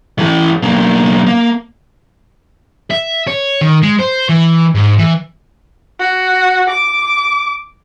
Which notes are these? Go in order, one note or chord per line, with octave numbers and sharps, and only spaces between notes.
E3 A3
B1 A#3
A#3
E5
C#5
D#3
G#3
C5
E3
G#2
E3
F#4
D6